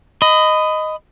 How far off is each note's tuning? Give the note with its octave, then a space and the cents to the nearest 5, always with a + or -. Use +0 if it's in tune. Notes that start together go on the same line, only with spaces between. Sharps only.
D#5 +0 B5 +25